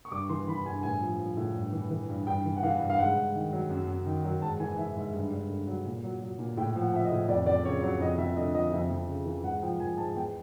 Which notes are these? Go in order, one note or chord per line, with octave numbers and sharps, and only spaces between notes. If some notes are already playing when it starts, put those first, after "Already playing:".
C#6
G2 D6
E3 C6
E3 B5
G2 G#5
A2 G#5
F3
F3
A2
G2
E3
E3
G2
G2 G5
E3
F#5
E3 F5
G2
F5
G#2 F#5
G#2
D#3
F#3
F#2
F#2
D#3
F#3
G#2 A5
E3 G#5
E3 E5
G#2 E5
G2
G2
D3
F#3
A#2
F#3
F#3
A#2
A2 G5
F3 F#5
F3 E5
D#5
A2
F2 D5
F2 D5
C#3 C#5
F#3 C#5
F2 D#5
F2 E5
D3 D#5
F3 D#5
F2 E5
F2
C#3
E3
G#2 F#5
F3 G5
F3 G#5
G#2 A5
E2 G5